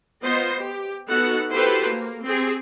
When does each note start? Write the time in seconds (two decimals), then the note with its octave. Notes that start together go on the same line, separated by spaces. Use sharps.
0.23 B3 F4 C5 D#5
0.60 G4
1.07 B3 D#4 F#4 A4 F#5
1.52 E4 F#4 G4 A4 B4 C5
1.89 A#3
2.25 C4 G4 G#4